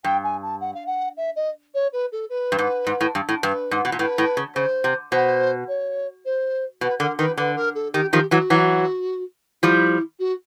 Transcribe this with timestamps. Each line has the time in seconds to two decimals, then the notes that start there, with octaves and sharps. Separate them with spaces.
0.04 G2 G5
0.24 G#5
0.42 A5
0.61 F#5
0.74 F5
0.86 F#5
1.17 E5
1.36 D#5
1.74 C#5
1.93 B4
2.12 A4
2.30 B4
2.52 G2
2.59 G#2
2.87 G#2
3.01 A2
3.15 G2
3.29 A2
3.43 G2 B4
3.71 G#2
3.85 B2
3.92 A#2
3.99 A2 B4
4.18 A2
4.37 C#3
4.55 C#3 C5
4.84 C3
5.12 B2 C5
5.68 C#5
6.25 C5
6.81 B2 B4
7.00 D3 A#4
7.19 D#3 B4
7.37 D3 B4
7.56 A#4
7.75 A4
7.93 D#3 G4
8.13 D#3 F3 G4
8.31 E3 F#3 F#4
8.50 E3 F#3
9.63 F3 G3 E4
10.19 F#4